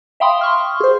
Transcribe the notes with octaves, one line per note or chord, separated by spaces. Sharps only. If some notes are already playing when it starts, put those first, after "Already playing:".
E5 F5 G5 B5 C6 D#6
C6 C#6 F6
G#4 C5